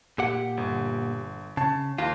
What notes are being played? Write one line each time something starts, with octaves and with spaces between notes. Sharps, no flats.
A#2 G4 F#5
G1
C#3 A5
D#2 F4